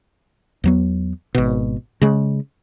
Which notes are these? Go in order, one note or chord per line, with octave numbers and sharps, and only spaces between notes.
E2 F#3 B3
G#1 B2
C#3 G#3